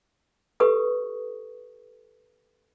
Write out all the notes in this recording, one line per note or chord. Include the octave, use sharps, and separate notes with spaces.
G4 A4 B4 C#6 D#6